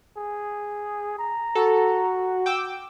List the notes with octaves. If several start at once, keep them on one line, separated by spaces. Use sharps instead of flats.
G#4
A#5
F#4 A4
G5 D6 E6